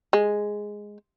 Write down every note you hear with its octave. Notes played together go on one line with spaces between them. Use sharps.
G#3